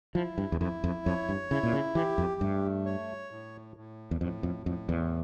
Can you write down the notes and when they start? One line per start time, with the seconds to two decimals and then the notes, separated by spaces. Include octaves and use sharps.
0.15 F3 E4
0.38 G2
0.52 E2
0.60 F2 E4
0.84 F2
1.05 F2 C#5
1.29 G2
1.51 C#3 E4
1.63 A#2
1.73 C#3
1.95 E3 G4
2.18 F2
2.41 G2 A3
2.86 C#5
3.31 A2
3.76 A2
4.11 E2
4.21 F2 A2
4.43 F2
4.66 F2 A2
4.89 E2